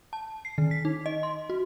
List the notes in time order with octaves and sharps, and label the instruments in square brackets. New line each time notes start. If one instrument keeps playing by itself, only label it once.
[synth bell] A5
C7
D#3
B6
D#4
D#5
C6
F#4